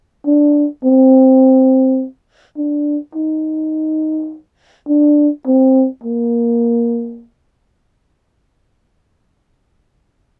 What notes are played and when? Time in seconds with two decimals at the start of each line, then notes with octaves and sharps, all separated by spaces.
0.26 D4
0.84 C4
2.57 D4
3.15 D#4
4.89 D4
5.47 C4
6.04 A#3